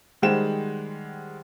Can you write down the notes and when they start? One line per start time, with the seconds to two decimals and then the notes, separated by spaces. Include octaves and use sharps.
0.22 D#3 G3 G#3 C5 F#5 E7